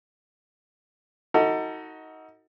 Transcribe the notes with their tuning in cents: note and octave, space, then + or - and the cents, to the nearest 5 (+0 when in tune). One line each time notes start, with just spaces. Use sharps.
D#4 +25 F#4 +0 A4 +35